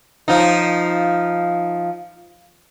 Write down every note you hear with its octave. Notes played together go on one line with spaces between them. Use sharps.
F3 D#4